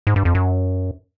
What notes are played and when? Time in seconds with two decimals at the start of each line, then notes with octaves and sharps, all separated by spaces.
0.07 G#2
0.16 G2
0.25 F2
0.35 F#2